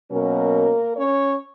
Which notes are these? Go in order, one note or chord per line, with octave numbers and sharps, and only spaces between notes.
B2 F#3 A#3 C#4 A#4
C#4 C#5